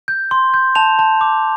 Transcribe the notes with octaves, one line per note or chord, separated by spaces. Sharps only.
G6
C6
G6
A5 F7
A5
D6